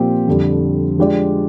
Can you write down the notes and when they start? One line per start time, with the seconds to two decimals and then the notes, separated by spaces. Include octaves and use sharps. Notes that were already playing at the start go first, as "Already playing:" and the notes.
Already playing: A#2 F3 C4 G4
0.27 F2 D3 G3
0.98 F3 G#3 D4 G4 D5